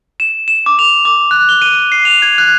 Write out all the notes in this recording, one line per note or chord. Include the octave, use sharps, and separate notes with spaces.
E7
E7
D6
F7
D6
F#6
G7
D#7
C7
F7
G#6
F#6